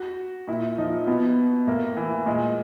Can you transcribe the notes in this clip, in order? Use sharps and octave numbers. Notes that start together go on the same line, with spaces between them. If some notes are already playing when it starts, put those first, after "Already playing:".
Already playing: F#4
A#2 E4
F3 D#4
B2 B3
A2 A#3
E3
A#2 G#3